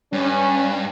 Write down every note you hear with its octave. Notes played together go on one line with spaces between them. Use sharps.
G2 C#4